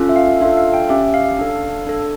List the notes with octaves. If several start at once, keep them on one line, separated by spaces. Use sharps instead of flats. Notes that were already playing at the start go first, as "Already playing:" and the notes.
Already playing: C#4 F4 A4
E5
F5
D4 F4 A4 E5
F5
G5
C#4 G4 E5
F5
D4 A4
D4 A4